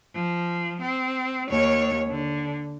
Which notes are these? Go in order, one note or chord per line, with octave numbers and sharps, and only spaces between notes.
F3
C4
D#2 C#5
D3